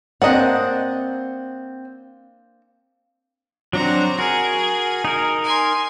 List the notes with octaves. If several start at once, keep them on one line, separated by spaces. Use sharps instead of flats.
A#3 C4 D4 D#5 F#5
F#3 C4 D4 F#4 A#5
F#4 G#4 A#4
D#4 A#4
G#5 C6